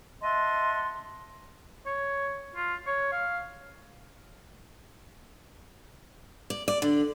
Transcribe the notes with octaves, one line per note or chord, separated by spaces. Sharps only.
D#5 E5 F#5 A5 C6
C#5
F4
C#5
F5
D5
D5
D3